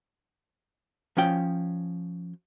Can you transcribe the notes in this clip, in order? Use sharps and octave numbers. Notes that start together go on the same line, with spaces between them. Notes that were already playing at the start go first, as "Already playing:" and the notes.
F3 C#4 G5